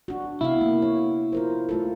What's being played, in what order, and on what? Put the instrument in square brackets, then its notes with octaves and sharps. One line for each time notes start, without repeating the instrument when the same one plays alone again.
[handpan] D4 F#4
[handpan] C3 B3 F5 [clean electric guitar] E4
[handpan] A#3
C#5
F4 A#4 C5
A3 F4 A4